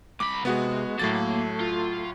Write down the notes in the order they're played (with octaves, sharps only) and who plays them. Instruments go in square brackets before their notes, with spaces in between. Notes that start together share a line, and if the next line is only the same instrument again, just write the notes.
[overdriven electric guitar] C2 B5 [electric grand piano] D6
[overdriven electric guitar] C3 [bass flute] G#3 [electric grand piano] B3 F#4 G#4
[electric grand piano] A2 F#3 A6 [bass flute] A3 [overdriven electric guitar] A#3
[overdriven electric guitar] F4